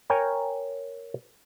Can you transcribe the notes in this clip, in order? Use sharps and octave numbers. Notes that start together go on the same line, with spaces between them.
A#4 C#5 G5 G#5 A#5